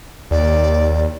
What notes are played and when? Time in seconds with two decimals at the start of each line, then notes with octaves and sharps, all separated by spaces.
0.31 D#2 D5